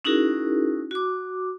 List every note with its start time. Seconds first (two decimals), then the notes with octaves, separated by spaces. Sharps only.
0.05 C#4 D#4 E4 F#4 G#4 A#4
0.91 F#4 D6